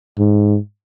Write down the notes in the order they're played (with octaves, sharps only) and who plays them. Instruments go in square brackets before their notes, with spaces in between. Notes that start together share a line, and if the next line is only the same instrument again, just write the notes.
[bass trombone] G#2